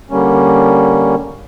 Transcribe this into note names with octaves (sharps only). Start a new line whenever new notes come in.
D3 G3 A#3 C#4